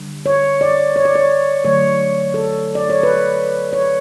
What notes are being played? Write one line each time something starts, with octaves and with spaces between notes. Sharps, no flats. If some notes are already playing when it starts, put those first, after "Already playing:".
Already playing: D3 G3
C#5
D5
C#5
D5
C#5
D3 F#3 A3 C#5
A4
D5
C#5
B4
C#5